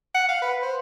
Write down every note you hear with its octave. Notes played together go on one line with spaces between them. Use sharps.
F#5
F5
B4
C5